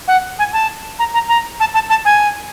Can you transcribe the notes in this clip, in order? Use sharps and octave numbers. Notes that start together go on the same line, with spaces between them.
F#5
G#5
A5
A#5
A#5
A#5
A5
A5
A5
G#5